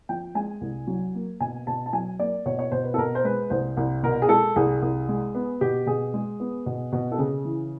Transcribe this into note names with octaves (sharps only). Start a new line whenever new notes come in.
F3 G5
G#3 G#5
C2
F#3
A#3
B2 G#5
B2 A5
A5
F#3 G#5
A#3 D5
B2 C#5
C#5
B2 C5
B4
A4
B2 A#4
C5
G#3 B4
C2 C5
C2
B2 A#4
G#4
G#3 A4
C2 G#4
C2
G#3
B3
B2 G4
B2 G#4
G#3
B3
B2
B2
A4
C#3 G#4
E3